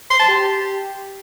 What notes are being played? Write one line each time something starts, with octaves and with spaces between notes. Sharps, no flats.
C6
A5
G4